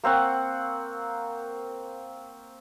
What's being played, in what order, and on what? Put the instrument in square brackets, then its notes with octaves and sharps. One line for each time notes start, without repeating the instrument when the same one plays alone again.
[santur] A#3 C4 F#5 C#6